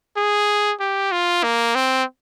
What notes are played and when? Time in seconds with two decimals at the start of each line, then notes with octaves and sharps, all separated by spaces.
0.17 G#4
0.80 G4
1.12 F4
1.43 A#3
1.75 C4